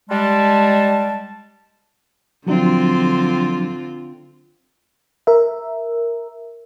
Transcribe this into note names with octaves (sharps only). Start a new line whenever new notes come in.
G3 G#3 A5
D3 F3 F#3 C4 D4 F4
A#4 E5